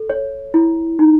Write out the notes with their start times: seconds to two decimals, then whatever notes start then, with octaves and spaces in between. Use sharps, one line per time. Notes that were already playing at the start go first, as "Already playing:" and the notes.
Already playing: A4
0.10 C#5
0.54 E4
0.99 D#4